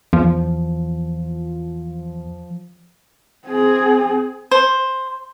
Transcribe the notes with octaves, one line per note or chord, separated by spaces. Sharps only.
E2 F3
C4 G#4
C5